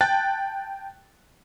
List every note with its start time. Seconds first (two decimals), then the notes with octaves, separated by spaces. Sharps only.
0.01 G5 A5 F#6 A6